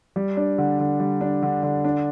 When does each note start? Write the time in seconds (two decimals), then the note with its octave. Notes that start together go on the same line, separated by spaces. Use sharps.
0.16 G3
0.37 D4
0.58 D3
0.79 D3
1.00 G3
1.21 D4
1.43 D3
1.63 D3
1.85 D4